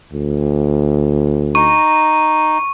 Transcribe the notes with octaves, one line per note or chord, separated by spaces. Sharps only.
D2
D#4 C#6